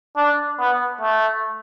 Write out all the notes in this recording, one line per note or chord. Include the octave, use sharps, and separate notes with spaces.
D4
B3
A3